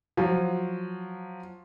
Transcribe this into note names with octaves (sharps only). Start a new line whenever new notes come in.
F3 F#3